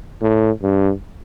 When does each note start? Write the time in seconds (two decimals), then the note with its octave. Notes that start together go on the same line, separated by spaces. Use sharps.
0.22 A2
0.63 G2